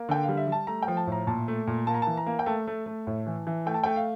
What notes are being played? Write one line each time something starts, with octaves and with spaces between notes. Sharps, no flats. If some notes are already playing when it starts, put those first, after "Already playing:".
Already playing: A#3
D3 G5
F5
G3
E5
G3 A5
A3 A#5
G5
F3
A5
A2
A#5
A#2 A5
A3
A#2
A#3 A5
A#5
E3 A5
A#5
A#3
G5
A3 A5
A3
A3
A2
E3
E3
A3 G5
A5
A3 G5
F5